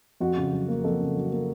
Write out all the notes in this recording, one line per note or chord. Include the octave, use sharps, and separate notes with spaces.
F2 F#4
C#3
F#3
A#3
F2 A4
C#3
F#3
A#3